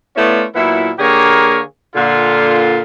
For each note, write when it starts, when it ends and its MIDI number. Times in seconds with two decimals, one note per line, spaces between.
0.16 0.44 57
0.16 0.44 59
0.16 0.44 61
0.16 0.44 64
0.16 0.44 65
0.16 0.44 74
0.55 0.91 46
0.55 0.91 54
0.55 0.91 59
0.55 0.91 64
0.98 1.60 50
0.98 1.60 58
0.98 1.60 67
0.98 1.60 68
0.98 1.60 70
0.98 1.60 73
1.95 2.83 46
1.95 2.83 50
1.95 2.83 65